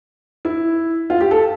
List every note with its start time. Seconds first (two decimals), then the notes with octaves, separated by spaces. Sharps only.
0.45 E4
1.10 F4
1.20 G4
1.31 A4